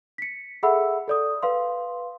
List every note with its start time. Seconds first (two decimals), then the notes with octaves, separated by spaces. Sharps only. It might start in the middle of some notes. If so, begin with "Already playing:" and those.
0.18 B6 C#7
0.63 G#4 A4 E5 F#5 B5 E6
1.08 A4 D5 D#6
1.43 B4 F5 C6